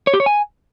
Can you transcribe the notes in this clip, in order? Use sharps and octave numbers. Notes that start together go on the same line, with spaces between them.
C#5
G4
C#5
G#5